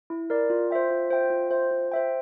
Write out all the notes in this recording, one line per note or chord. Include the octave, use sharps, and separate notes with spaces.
E4
A#4 D5
F4
C5 E5 G5
F4
C5 E5 G5
F4
C5 E5 G5
F4
C5 E5 G5